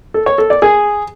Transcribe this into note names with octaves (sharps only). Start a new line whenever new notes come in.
A4
C#5
A4
D5
G#4